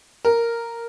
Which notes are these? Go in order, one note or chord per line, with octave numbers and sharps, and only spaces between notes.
A#4